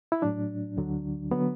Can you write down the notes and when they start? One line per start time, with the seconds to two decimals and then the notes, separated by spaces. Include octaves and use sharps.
0.12 E4
0.22 A2 F#3 D4
0.77 D2 D3 F#3
1.31 D3 F#3 B3